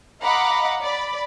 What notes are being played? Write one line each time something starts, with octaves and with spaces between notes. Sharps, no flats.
D#5 F5 F#5 A#5 B5 D6
D5 B5